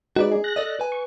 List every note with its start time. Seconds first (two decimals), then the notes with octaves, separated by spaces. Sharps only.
0.16 G#3 D#4 F#4 B4 D5
0.32 G#4
0.44 F#6 A#6
0.56 A4 D5 D#5
0.80 B4 G#5
0.92 C#6